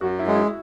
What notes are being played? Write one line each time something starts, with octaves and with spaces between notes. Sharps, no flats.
F#2 F#4
E4
G#3
E4